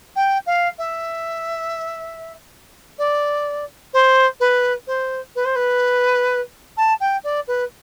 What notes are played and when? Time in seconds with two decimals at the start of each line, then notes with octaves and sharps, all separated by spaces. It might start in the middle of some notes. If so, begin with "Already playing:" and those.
0.16 G5
0.46 F5
0.78 E5
2.98 D5
3.94 C5
4.40 B4
4.87 C5
5.36 B4
5.45 C5
5.56 B4
6.77 A5
7.00 G5
7.24 D5
7.48 B4